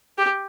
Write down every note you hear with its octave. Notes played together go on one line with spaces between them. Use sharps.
G4